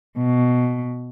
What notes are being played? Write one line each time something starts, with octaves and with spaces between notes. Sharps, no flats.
B2